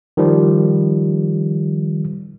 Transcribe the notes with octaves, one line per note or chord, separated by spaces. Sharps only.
D#3 F3 G3